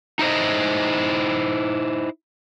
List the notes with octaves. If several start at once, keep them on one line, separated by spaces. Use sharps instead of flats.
D#4 E4 C5 D#5